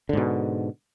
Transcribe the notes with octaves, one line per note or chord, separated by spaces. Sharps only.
G#2 B2 D3